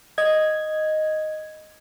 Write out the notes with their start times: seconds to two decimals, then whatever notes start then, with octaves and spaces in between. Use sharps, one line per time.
0.18 D#5 G#6